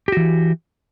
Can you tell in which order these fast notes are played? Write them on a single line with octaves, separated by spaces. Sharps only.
G4 F#4 E3